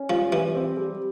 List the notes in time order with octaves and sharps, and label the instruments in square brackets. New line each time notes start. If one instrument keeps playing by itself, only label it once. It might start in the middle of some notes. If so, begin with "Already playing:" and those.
Already playing: [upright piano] C#4
[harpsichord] F3 [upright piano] G3
[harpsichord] E3 [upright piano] G3
[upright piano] C4
G3